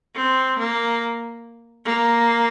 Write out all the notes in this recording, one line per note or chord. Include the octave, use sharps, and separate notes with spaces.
C4
A#3
A#3